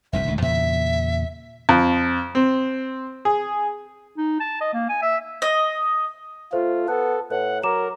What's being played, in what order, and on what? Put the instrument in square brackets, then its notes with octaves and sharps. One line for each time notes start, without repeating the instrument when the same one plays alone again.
[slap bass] F1 C2 G2 [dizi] E5
[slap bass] D#1 D2 G#3
[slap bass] E2 A#2 C#3 [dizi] E5
[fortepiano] F2
C4
G#4
[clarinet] D#4
A5
D#5
A#3
G#5
E5
[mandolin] D#5
[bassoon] A3 [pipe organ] F4 [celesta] C5
[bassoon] B3 [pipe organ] A4 [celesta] F#6
[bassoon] A2 [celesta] B4 [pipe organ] F#5
[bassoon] F#3 [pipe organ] A#4 [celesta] A#5 D6 E7